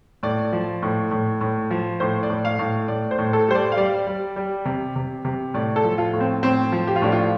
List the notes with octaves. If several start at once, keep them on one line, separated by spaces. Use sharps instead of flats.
A2 D5
F3
A2
A2
A2
F3
A2 C5
D5
A2
F5
A2
A2 D5
C5
A2
A4
G3 C5
D5
F5
G3 D5
G3
G3
C3
C3
C3
A2 D5
A4
F3
F4
A2
C4
A2 C4
F3
G4
F4
A2 D4
F4